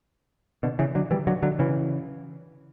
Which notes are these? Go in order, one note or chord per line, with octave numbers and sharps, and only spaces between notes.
B2 D3
C#3 E3
D3 F#3
E3 G3
D3 F#3
D3 F#3
C#3 E3